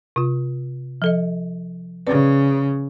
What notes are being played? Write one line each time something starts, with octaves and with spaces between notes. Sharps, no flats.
C3 F4
F3 A4 D#5
C#3 B4 D5